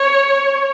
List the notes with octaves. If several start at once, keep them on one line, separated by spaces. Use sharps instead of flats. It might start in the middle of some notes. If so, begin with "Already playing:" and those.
Already playing: C#5